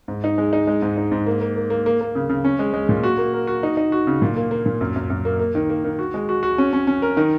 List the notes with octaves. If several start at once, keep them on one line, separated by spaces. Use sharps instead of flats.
G#2
D#4
G#3
D#4
G#3
G#2
D#4
G#2
A#3
A#3
A#3
A#3
A#3
A#3
C#3
C#3
C#4
G#3
G#3
A#2
F#4
A#3
A#4
F#4
D#4
D#4
F#4
C#3
A#2
A#3
A#3
A#2
F#2
F#2
F#2
A#3
A#3
D#3
A#3
D#3
F#4
G#3
F#4
F#4
C#4
C#4
C#4
A#4
D#3